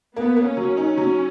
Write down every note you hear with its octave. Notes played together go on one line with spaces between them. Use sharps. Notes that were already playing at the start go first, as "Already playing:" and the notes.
A#3 B3
A#3
C#4
F#3
D#4
F#3